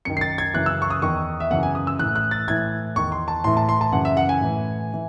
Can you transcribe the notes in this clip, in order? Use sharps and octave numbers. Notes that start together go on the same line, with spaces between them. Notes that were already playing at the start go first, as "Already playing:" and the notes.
F#2 D#3 C#7
C7
A6
G#6
F#2 C#3 E3 F#6
E6
C#6
D#6
E2 D#3 C#6
E5
F#2 C#3 E3 F#5
G#5
D#6
E6
A2 E3 F#6
F#6
A6
A2 E3 G#6
E2 D#3 C#6
C6
A5
A2 E3 C6
A5
C6
A5
F#2 C#3 E3 F#5
E5
F#5
G#5
A2 E3
E3